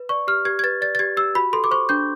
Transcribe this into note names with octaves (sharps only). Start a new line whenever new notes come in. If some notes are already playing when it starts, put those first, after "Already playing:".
Already playing: B4
D5 C#6
G4 F6
G4 G#6
G#6
B4 A6
D5 A6
A6
G4 G#6
G4 E6
F#4 B5
A4 C6
D6
C5 C#6
D4 G6